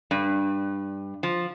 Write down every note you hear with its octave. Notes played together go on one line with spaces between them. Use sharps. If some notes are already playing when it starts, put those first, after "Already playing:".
G2
F3